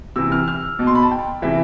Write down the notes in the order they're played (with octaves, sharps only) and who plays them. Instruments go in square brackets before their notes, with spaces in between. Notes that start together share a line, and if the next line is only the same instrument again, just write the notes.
[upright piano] C3 E3 E6
F6
F6
B2
C6
B5
A5
G5
C3 E3 E5